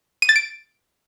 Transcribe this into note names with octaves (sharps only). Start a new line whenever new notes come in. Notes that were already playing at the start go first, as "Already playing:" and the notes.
D#7
A6
D7